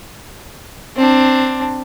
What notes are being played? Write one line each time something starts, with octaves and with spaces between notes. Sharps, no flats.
C4 D4